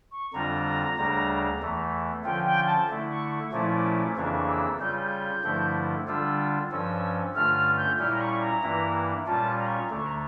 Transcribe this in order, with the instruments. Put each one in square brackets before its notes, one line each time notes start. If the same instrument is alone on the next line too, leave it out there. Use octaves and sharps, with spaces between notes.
[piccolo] C#6
[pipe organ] F2 D3 G3 D4 F4 [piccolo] A#5
[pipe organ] D2 C#3 G3 D4
E2 E3 A3
[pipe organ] D3 F3 C#4 F4 [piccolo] G5
[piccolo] G5
A5
[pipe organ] D3 A3 E4
[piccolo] C#6
C#6
[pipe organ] A#2 F3 A3 C#4 E4 [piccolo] D6
[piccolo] D6
D6
[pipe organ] F2 C#3 E3 A#3 D4 [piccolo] C#6
[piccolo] D6
C#6
E6
[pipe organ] C#3 G3 C#4 F4 [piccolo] G6
[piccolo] G6
[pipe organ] G2 D3 F3 A3 E4
[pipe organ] D3 G3 D4 F4 [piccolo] E6
[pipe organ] G2 F3 C#4 [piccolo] E6
[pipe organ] G2 D3 A3 C#4 F4 [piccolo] F6
[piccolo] F6
G6
[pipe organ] A#2 G3 C#4 E4 [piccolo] F6
[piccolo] A#5
C#6
A#5
[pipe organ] G2 E3 A#3 E4
[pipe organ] A#2 G3 C#4 F4 [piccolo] A5
[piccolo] A#5
C#6
A#5
[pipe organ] D2 D3 A3 [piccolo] D6
[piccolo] C#6
A#5